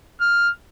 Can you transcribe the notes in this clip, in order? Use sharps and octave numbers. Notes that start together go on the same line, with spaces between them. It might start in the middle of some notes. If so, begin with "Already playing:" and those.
F6